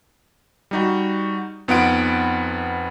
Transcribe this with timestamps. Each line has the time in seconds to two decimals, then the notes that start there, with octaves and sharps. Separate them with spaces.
0.71 G3 D#4 F#4
1.68 F2 B3 D#4 F4 F#5 D7